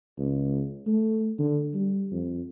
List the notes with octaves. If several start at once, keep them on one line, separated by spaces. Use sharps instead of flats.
C#2
A3
D3
G3
F2